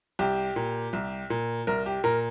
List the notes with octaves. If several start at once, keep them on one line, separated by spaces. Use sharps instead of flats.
C2 G4
A#2
C2
A#2
C2 A#4
G4
A#2 A#4